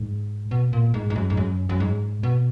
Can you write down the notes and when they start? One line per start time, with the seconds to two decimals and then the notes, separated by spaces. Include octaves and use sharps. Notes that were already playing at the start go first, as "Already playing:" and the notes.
Already playing: G#2
0.51 B2
0.73 A#2
0.94 G#2
1.10 G#2
1.16 F#2
1.30 G#2
1.37 F#2
1.69 F#2
1.80 G#2
2.23 B2